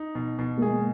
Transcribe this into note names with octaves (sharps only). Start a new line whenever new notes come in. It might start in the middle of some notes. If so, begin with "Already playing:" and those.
Already playing: D#4
B2
B2
A#3
G#3 G#4